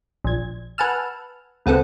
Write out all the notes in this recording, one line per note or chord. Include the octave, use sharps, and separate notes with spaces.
A#1 G#6
B4 F#5 G#5 A5 E6 F6
C#2 B3 C4 A4 F#5